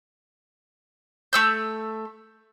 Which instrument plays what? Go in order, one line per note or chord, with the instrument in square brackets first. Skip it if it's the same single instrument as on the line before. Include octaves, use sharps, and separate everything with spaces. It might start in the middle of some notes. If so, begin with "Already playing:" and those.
[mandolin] A3 E6 G6